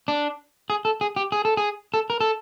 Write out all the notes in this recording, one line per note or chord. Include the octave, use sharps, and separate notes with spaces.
D4
G#4
A4
G#4
G4
G#4
A4
G#4
A4
A#4
A4